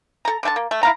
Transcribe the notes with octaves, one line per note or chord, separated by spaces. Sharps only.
A4 A#5
D3 A3 A5
A#3
A3
E4 F5 A#5